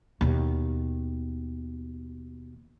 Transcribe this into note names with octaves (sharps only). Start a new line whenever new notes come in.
D#2 B2